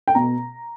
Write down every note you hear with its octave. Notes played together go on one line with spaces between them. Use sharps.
G5
B2 A#5